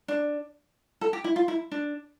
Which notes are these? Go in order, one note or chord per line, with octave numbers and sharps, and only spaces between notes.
D4
A4
G4
E4
F4
E4
D4